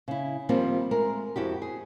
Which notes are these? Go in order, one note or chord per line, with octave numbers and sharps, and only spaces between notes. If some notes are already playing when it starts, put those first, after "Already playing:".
C#3 E4
D#3 F3 G3 A#3 C4 F4
G#3 A3 A#4
F2 E4 F#4 G4
G#4